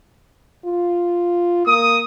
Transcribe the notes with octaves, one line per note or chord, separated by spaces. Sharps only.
F4
A#3 D#6